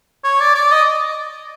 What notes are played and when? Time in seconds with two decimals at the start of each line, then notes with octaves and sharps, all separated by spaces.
0.24 C#5
0.40 D5
0.55 D5
0.71 D#5